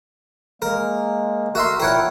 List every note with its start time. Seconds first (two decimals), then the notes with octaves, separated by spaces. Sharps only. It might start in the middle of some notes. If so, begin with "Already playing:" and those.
0.62 G#3 A#3 A#4
1.55 A3 F#4 A#4 E5 C6
1.80 A#2 E4 A#4 C#5 F#5 G5